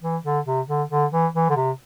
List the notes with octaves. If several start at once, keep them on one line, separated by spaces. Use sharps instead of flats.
E3
D3
C3
D3
D3
E3
E3
D3
C3